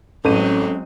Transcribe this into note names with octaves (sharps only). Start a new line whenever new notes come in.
A1 F#3 G#3 C4 C#4 A4 D#7